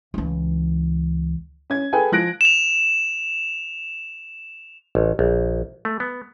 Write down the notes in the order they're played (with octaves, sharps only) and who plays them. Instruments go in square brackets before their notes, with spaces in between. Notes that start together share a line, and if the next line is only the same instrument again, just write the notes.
[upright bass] C#2 E3
[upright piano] C#4 G#6
G#4 A4 B4 G5 G#5
F3 F#6 A#6 D7
[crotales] E7 F7
[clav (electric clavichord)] A1
A#1
A3
B3